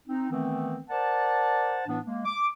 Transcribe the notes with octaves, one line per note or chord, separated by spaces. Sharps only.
C4 D#4
D#3 E3 A3 B3 C4
A#4 C5 D5 F#5 A5
A2 E3 B3 D4
G#3 A#3
D6